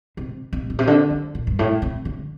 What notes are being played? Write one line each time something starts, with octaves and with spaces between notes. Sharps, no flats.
C3
C3
A#2
C3
D3
D3
A#2
G2
A2
C3
D3